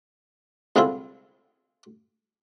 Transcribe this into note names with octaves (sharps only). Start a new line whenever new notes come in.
C2 D3 G#3 C4 E4 F4